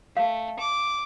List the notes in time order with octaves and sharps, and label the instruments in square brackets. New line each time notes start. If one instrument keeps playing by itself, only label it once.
[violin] A3 [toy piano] F5
[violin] D6